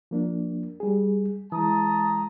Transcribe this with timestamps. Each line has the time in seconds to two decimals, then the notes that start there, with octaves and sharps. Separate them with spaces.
0.11 F3 A#3 D4
0.80 G3 G#4
1.52 E3 G#3 A5 A#5 D#6